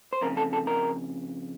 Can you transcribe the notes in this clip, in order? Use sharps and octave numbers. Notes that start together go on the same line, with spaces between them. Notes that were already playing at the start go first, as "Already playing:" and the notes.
C5
F2 C#3 A#4
A4
A4
A#4